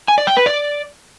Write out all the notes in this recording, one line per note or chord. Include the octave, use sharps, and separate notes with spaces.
G#5
D5
G5
B4
D5